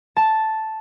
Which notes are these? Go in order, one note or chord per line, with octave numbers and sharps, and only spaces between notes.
A5